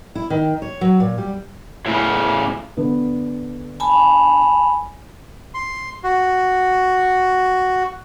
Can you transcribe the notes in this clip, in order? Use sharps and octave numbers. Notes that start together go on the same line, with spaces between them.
E4
D#3
C#5
F#3
A#2
G3
A2 C#3
D3 B3
G#5 A5 B5
C6
F#4